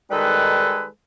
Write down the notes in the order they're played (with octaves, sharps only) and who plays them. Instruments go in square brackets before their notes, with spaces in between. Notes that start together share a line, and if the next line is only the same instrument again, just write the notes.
[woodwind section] D#3 G3 G#3 D#4 A4 B4